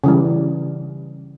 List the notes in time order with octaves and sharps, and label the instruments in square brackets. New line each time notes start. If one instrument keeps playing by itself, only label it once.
[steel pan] C#3 E3 G3